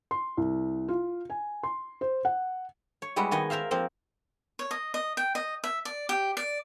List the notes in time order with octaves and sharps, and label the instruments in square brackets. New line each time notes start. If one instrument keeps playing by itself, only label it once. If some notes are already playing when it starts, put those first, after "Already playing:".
[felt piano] C6
C2
F4
G#5
C6
C5
F#5
[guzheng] C#5
G3 G#3 B3 E4 F#4 F#5
D#3 B3 D#5 F#5 G#5
A#4 C5 E5 F5
F3 A#3 C4
[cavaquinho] C#5
D#5
D#5
G5
D#5
E5
D5
G4
D5